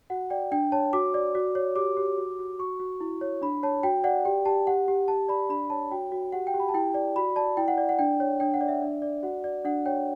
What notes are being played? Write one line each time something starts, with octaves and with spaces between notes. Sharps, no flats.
F#4 F#5
D5 G5
D4 G5
C#5 A5
F#4 D6
D5
F#4
C#5
G4 D6
G4
F#4
F#4
F#4 C#6
F#4
E4
C#5
D4 B5
C#5 A5
F#4 G5
D5 F#5
G4 G5
G4 A5
G4 F#5
G4
G4 A5
D5 B5
D4 B5
C#5 A5
F#4 G5
F#4
G4 F#5
G5
G4
B5
A5
E4 G5
D5
F#4 B5
D5 A5
E4 G5
F#5
D5
F#5
D4 G5
C#5
D4 G5
F#5
D5
E5
D4
D5
F#4 F#5
D5
D4 F#5
C#5 G5